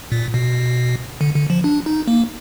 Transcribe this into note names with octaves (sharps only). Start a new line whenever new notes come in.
A#2
B2
D3
D3
F3
D4
D#4
A#3